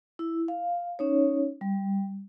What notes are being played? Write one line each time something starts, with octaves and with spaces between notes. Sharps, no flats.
E4
F5
C#4 D#4 C#5
G3